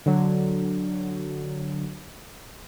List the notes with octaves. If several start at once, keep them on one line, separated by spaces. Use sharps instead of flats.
D3 F#3